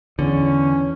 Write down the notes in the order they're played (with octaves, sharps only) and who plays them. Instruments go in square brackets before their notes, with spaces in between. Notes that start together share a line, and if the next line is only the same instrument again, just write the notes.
[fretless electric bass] E2 [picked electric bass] D3 [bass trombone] C#4